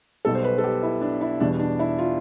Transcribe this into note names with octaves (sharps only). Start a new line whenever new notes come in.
B1 B2 G3 A4
C5
B4
A4
G4
E4
D4
E4
E2 B2 G3 D4
D4
E4
F4